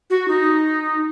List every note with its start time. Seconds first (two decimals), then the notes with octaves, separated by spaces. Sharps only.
0.10 F#4
0.28 D#4